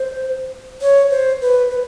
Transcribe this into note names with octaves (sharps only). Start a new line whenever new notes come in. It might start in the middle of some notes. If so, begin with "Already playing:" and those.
Already playing: C5
C#5
C5
B4
B4